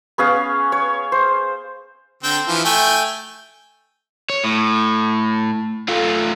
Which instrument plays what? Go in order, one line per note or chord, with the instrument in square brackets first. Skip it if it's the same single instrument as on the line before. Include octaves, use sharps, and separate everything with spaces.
[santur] B3 C#4 G#4 F5
C#5
C5
[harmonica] D3 C4 G5
E3 F3
A3 G5 G#5
[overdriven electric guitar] C#5
A2
A3 F4